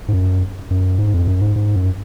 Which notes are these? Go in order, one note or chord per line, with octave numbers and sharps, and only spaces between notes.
G#2
F#2
F#2
G#2
F2
F#2
G#2
G#2
F#2